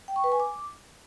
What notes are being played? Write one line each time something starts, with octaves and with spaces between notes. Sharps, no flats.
G5
C#6
B4
G#5
D6